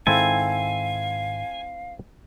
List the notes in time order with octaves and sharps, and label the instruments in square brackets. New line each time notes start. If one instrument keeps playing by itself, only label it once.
[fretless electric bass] G#2 D#3 G#3 [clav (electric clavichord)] C4 E4 A4 [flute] F5 [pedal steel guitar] G#5